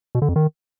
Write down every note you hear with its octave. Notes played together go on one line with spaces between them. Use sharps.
B2
D3
F2
D#3